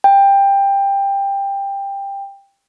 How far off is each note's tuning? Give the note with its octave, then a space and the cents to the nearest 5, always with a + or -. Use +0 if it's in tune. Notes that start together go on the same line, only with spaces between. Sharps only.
G5 +15